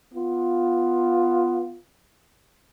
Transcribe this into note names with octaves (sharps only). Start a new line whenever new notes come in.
B3 F4